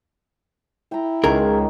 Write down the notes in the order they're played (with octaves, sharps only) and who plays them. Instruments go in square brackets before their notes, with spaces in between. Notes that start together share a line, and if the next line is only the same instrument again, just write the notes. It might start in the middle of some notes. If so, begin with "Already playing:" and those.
[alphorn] E4 [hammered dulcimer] G5 A#5
[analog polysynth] C#2 [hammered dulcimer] D#3 D#4 G5 [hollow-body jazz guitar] G#4 A#4